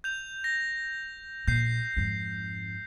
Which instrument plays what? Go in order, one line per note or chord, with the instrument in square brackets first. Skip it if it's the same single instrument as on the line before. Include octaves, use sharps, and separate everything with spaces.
[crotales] G6 F7
A#6
[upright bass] A#1 A#2 [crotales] G6 C7
[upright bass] F2 G#2